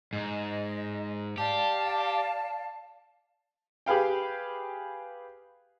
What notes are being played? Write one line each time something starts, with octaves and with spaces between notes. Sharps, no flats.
G#2 D#5
G4 D5 F5 A5
G4 G#4 B4 F5 G5